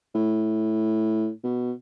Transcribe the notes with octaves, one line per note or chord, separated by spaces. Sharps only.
A2
B2